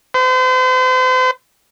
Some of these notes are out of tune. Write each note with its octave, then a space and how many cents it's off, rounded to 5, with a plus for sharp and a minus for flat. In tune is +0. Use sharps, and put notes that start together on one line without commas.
C5 -40